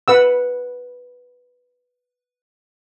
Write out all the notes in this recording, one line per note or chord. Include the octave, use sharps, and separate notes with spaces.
B4 F#5 E6